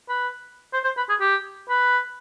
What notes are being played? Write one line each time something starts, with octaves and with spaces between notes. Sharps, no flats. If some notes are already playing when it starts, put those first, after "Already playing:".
B4
C5
C5
B4
G#4
G4
B4